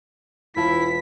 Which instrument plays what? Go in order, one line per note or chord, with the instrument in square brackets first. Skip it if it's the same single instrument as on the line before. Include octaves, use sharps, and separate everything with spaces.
[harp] E1 F4 A5 [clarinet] E4 [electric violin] B6